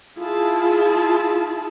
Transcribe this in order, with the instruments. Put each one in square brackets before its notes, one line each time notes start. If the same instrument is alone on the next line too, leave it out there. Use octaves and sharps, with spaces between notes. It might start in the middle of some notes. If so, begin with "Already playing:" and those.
[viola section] E4 F4 G#4 A5